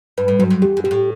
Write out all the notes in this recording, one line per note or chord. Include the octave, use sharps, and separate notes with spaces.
G2 B4
A2
G2 F#3
F#2
E2 G4
F#2
B2 G4
A2